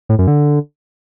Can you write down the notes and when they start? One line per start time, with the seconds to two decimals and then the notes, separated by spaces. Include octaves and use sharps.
0.09 A2
0.18 F#2
0.28 D3